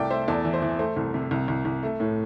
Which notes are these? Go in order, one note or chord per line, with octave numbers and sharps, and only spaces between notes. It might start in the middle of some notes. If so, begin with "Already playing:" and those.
Already playing: C2 A3 D5 E5 G5 A5
A3 C5 E5
E2 A4 D5
E3
C5
E3
A3 C5
C2
C3
C2
C2
C2
A3
A2